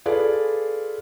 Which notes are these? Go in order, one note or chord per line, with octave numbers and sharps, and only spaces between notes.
F4 G#4 A4 B4 D5